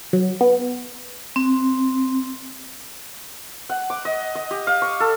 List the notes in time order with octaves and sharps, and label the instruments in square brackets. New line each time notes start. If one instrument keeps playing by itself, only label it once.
[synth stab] F#3
B3
[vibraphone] C4
[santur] F#5
D6
D#5
D#5
G4
F5
C#6
A4